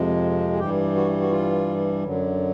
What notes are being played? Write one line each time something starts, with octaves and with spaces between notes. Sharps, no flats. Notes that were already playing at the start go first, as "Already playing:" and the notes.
Already playing: F2 C3 F3 G#3
G#4
G2 E3 G3 G4
F#4
F#4
F4
F#2 D3 F#3